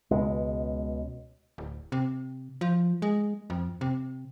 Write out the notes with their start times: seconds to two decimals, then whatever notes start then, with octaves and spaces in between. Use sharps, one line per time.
0.11 C#2 B2 G#3
1.58 D1
1.92 C3
2.61 F3
3.02 G#3
3.50 F2
3.81 C3